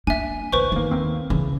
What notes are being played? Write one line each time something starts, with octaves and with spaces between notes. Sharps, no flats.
A#3 D4 E5 G#5
A1 D2 B4 C5 C#6
G1 D#3 A#3
D#2 A#3 C4
C#3 E3